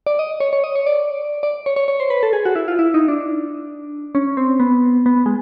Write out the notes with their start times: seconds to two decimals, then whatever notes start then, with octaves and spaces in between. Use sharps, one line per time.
0.07 D5
0.19 D#5
0.40 C#5
0.53 C#5
0.64 D#5
0.75 C#5
0.86 D5
1.43 D5
1.66 C#5
1.76 C#5
1.88 C#5
2.00 C5
2.10 B4
2.23 A4
2.33 G#4
2.45 F#4
2.56 E4
2.68 F4
2.79 E4
2.94 D#4
3.08 D4
4.15 C#4
4.37 C4
4.60 B3
5.06 B3
5.26 G#3